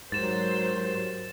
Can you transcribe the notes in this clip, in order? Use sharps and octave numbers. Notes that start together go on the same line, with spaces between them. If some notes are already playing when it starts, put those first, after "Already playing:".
G#2 F#3 G4 A#4 C5 A6 E7